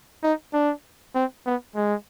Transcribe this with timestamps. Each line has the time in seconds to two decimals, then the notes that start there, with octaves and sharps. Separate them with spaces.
0.23 D#4
0.53 D4
1.15 C4
1.46 B3
1.76 G#3